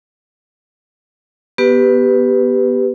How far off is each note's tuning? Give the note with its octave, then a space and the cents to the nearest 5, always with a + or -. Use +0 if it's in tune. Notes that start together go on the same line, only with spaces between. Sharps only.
B3 -10 G4 +0 B4 +10